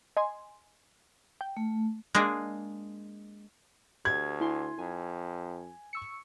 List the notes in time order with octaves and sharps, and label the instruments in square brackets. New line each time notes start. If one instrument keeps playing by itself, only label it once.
[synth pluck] D#5 G#5 C6
G5
[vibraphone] A3
[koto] G#3 A#3 D4 G#4
[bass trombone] D2 [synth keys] G4 [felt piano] G#6
[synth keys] E4 G#5 C6
[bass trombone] F2 [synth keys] G#5
[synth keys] C#6 E6 C#7